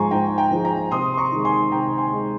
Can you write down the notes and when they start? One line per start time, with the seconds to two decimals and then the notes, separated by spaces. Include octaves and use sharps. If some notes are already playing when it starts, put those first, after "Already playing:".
Already playing: G#2 F3 G#3 G#5 A#5 C6 C#6
0.11 G#2 G5 A#5
0.38 G5 A#5
0.51 F3 G#3
0.64 G5 A#5
0.91 C3 C6 D#6
1.14 C6
1.17 A#5 C#6
1.32 D#3 G#3
1.45 G#5 C6
1.72 C3 G5 A#5
1.98 G#5 C6
2.12 D#3 G#3